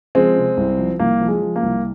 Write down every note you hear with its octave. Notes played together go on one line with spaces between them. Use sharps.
F3 G#3 C4
C3
C2
F3
C2 A#3
F3
G#3
F3
A#3
C2